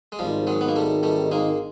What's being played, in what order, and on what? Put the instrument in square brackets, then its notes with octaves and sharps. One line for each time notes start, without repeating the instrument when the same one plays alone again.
[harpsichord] G#3
[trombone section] G#1 G#2 D#3 [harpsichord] F3 G3
[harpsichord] F#3 G#3
B3
A#3
G3 A3
G3 A3
G#3 A#3